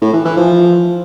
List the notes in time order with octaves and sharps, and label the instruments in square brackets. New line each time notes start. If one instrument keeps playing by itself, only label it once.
[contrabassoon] A2
E3
E3
F3